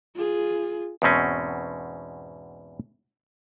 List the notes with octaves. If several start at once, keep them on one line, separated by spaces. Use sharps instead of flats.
F4 G#4
E2 G#2 B2 C4 C#4